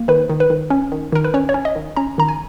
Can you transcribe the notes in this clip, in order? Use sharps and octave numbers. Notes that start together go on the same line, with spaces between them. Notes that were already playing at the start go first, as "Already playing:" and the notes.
Already playing: A#3
D#3 B4
D#3
B4
D#3
C#4
D#3
D#3 A#4
B4
C#4 C#5
C#5
C#4
D#5
D#3
C#4 A#5
D#3 A#5
G#5